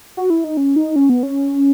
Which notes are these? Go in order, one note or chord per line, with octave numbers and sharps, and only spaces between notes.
F#4
E4
D#4
C#4
D#4
C#4
B3
C#4